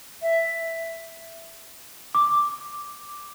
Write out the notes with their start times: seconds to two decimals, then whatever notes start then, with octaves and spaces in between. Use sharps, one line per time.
0.22 E5
2.15 D6